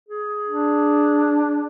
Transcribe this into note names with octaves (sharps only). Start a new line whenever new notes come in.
G#4
D4